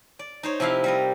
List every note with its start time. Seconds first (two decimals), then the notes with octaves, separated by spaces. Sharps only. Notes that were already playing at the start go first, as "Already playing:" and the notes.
0.19 D5
0.43 D#4 C5 C#5
0.60 C3 F3 E4 F5
0.84 G3 A#4 D#5